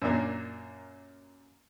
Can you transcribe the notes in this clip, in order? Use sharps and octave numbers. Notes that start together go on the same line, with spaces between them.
F#2 A#2 A#3 D4